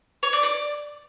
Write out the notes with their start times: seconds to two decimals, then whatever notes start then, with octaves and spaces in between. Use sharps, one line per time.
0.23 C#5
0.33 D5
0.43 D5